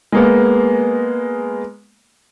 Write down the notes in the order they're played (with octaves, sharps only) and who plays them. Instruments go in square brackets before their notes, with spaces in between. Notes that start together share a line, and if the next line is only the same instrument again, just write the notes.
[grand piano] G#3 A#3 B3